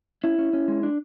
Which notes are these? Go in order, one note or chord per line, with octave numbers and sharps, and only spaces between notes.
C#4 E4
C#4
C#4
G#3
D4